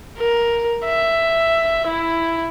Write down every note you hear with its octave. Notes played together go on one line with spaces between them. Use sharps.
A#4
E5
E4